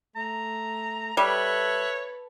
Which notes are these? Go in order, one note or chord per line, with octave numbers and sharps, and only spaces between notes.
A3 A#5
G3 A4 B4 C#5 E5 F#6